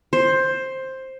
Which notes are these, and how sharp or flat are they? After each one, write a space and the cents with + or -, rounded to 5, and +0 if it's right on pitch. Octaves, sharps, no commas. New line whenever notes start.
C5 +10